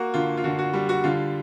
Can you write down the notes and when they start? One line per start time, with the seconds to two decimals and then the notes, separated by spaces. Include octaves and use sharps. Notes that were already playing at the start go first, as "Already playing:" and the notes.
Already playing: A#3 F#4
0.14 D3 F4
0.37 F4
0.44 D3 F#4
0.59 F#4
0.73 G3
0.89 F#4
1.04 D3 F4